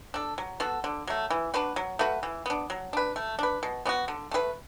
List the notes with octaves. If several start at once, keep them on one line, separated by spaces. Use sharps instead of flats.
D4 A4
F#3
B3 F#4 A4
D3
F#3 A3
E3
D4 F#4 B4
F#3
A3 F#4 B4
E3
B3 D4
F#3
D4 B4
A3
D4 B4
B2
B3 D4 F#4
D3
A3 F#4 B4